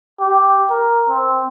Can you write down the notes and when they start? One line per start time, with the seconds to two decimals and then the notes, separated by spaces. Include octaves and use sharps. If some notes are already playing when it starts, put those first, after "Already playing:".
0.20 G4
0.70 A#4
1.09 C4